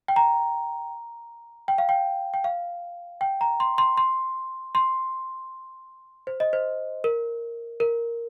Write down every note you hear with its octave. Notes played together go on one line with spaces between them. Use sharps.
G5
A#5
G5
F5
G5
G5
F5
G5
A#5
C6
C6
C6
C6
C5
D#5
C5
A#4
A#4